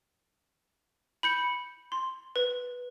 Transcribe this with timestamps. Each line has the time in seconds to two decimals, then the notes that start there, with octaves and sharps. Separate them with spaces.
1.23 B5 G6 C#7
1.92 C6
2.36 B4